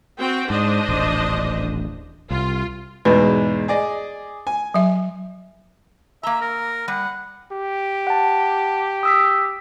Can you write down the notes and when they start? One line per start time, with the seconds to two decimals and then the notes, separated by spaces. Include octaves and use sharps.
0.20 C4 F#4 G5
0.50 G#2 D4 C5 D#5
0.89 D#1 A1
2.31 C2 F4
3.05 E2 G#2 B2 B4
3.68 G#4 D5 D#5
4.47 G#5
4.74 F#3 E5
6.23 A#3 E5 A#5
6.41 A#4
6.88 G3 F#5
7.52 G4
8.07 F#5 A5
9.03 D#6 E6 B6